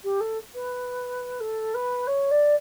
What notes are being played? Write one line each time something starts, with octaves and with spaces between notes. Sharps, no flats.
G4
A4
B4
A4
B4
C#5
D5